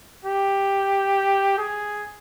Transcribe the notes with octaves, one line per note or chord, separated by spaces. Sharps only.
G4
G#4